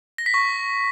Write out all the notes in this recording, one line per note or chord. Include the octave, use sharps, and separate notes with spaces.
A#6
B6
C#6